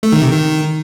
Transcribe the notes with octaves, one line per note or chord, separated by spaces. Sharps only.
A3
D#3
C3
D#3